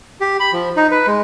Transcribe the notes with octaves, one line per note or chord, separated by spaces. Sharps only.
G4
B5
F3
D#4
B4
G#3